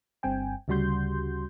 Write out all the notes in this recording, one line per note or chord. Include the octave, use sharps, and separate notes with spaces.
G1 G2 C4 G5 G#5
D2 C#3 G3 F#4 C6 G6